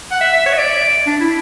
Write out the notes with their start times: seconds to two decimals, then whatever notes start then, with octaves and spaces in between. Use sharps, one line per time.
0.11 F#5
0.21 E5
0.33 E5
0.46 C#5
0.53 E5
0.58 D5
1.07 D4
1.20 E4